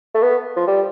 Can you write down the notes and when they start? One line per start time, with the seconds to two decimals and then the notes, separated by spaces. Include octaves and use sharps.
0.14 A3
0.22 B3
0.56 F3
0.67 G3